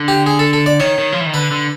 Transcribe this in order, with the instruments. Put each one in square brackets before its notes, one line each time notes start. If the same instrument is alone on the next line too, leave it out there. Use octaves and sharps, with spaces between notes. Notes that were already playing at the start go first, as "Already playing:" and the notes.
Already playing: [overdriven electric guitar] D3
[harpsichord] G4
G#4
A4
A4
D5
[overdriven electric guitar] D#3 [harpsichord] C#5
[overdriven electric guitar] D#3
F3
E3
D#3
[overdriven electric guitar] D3 [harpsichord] B4
[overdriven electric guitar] D3